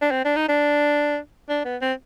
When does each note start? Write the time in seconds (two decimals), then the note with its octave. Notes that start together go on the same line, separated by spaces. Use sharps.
0.02 D4
0.11 C4
0.25 D4
0.36 D#4
0.49 D4
1.49 D4
1.65 B3
1.81 C4